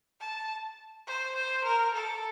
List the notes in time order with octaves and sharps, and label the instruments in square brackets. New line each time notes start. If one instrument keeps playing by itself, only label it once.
[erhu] A5
C5
C5
A#4
A4